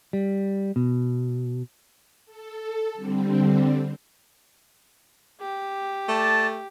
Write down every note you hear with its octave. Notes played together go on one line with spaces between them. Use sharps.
G3
B2
A4
D3 G3 C4
G4
A3 D5 A5